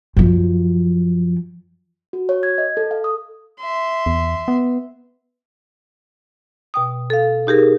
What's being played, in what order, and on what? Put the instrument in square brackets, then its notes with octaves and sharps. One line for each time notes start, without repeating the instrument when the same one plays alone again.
[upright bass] F#2 F3
[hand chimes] F#4
C#5
G#6
D#5
A4
F5
D#6
[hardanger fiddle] E5 C6
[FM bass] E2
B3
[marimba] B2 G5 D#6
A4 F5
D#4 G4 G#4 A#4